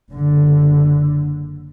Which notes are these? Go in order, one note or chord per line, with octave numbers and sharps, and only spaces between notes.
F#1 D3